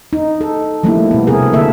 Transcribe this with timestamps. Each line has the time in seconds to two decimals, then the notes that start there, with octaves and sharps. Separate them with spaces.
0.13 D#4
0.41 A4
0.83 F3 G3 A3 A#3 D4 E4
1.11 B2 B3
1.27 C3 C4 G#4 A#4
1.53 D3 A#3 A4 E5